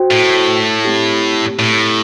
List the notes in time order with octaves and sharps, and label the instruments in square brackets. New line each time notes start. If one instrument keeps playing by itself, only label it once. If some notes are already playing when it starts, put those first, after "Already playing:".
Already playing: [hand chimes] F#4 C5 G5
[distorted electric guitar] A2
[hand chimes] A3 C4 G4
[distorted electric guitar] A2